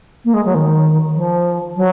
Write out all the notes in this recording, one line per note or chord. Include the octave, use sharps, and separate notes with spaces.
A#3
G#3
F#3
D#3
F3
F#3